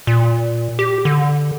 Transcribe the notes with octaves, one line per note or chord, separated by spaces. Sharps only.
A#2
G4
D3